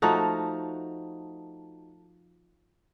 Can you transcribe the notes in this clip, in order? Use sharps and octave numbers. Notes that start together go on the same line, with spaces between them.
F3 A3 D#4 F#4